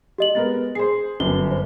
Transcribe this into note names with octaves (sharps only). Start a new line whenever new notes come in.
G4 D#5 F#7
G#3 B3 A#4 A6
G#4 C5 C7
G1 F#2 G7
C5